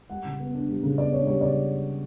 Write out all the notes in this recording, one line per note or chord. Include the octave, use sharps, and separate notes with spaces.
G3 F#5
C#3
B3
D4
G3
C#3
B3 D5
D4 C#5
G3 C#5
C#3 D5